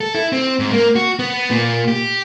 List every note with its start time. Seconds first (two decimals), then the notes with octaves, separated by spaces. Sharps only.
0.01 A4
0.15 E4
0.32 C4
0.59 G#2
0.72 A#3
0.96 F#4
1.19 B3
1.51 A#2
1.88 G4